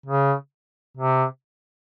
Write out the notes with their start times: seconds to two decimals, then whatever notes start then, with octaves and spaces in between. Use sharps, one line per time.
0.06 C#3
0.97 C3